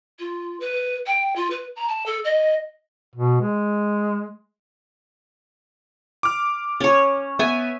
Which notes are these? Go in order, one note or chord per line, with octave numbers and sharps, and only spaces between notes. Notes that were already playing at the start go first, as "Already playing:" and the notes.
F4
B4
G5
F4
B4
A#5
A5
A4
D#5
B2
G#3
D6 F6
C#4 C#5
B3 E5 G#5